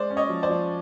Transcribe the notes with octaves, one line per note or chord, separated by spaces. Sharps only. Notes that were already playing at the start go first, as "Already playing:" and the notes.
Already playing: G#3 C5 D5
C#4
C#5 D#5
F3
C5 D5
F3